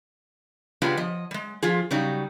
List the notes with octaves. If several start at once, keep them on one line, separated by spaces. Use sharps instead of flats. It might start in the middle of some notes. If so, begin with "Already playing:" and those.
C#3 G#3 B3 D4 F4 G4
F3 D#5
G3 G#3
F3 F4 G#4
C#3 F#3 G3 D#4